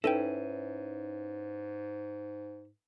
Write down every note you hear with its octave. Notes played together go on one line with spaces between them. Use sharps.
G#2 C#4 D#4 E4 A4 B4 G5 D#7